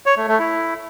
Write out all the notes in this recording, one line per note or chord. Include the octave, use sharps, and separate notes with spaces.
C#5
A3
A3
E4